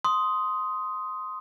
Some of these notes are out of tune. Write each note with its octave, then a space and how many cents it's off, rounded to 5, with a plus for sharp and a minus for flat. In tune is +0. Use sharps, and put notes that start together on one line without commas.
C6 +0 D#6 +10